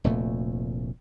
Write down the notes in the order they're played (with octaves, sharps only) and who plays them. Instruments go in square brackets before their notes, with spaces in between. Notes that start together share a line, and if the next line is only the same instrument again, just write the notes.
[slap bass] F1 D2 A#2 A3